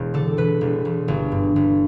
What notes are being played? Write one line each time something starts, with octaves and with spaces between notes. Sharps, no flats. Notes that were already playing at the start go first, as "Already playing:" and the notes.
Already playing: E1
D3 A4
E1 B4
E1
E1
G1
G2
G1